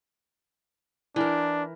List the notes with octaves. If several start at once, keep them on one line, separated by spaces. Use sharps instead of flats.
E3 D4 A#4